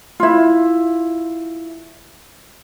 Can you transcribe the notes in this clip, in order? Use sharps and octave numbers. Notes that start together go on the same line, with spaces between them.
E4 F4